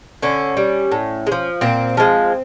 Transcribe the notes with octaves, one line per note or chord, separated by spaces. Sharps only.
D3 C#4
G3
A2
G#3
F3
A#2 C4
F3 G#3